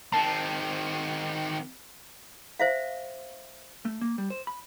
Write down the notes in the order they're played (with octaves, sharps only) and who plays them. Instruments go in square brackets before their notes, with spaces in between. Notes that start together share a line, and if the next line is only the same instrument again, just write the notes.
[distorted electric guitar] D#3 C4 [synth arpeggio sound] A5
[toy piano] C5 E5 F5
[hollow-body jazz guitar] A3
A#3
G3
C5
B5